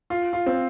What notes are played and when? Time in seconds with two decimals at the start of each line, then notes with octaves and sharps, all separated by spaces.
0.10 F4
0.33 F4
0.46 C4